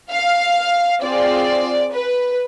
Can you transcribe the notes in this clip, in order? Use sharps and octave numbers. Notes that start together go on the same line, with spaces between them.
F5
C4 F4 G#4 D5
B4